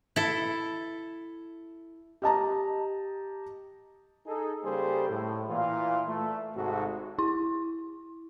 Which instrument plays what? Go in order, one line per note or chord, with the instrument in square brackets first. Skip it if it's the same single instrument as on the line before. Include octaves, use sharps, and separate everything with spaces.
[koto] E4 A4
[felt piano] G4 D#5 A5 A#5
[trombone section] D#4 G#4 A4
C#3 G3 A#3 G#4 A4 C5
A2
A#2 E3 F4
A3
G#1 G#2 C3 F#4 A4
[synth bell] E4